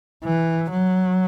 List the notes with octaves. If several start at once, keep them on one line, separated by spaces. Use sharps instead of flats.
E3
F#3